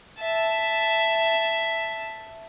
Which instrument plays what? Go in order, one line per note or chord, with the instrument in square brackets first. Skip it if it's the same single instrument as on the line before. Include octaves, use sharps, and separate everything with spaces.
[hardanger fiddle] E5 A5